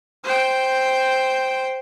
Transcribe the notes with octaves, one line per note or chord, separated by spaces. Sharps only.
C5 G5